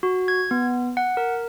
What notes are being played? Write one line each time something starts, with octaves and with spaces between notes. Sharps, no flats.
F#4
G#6
B3
F#5
A#4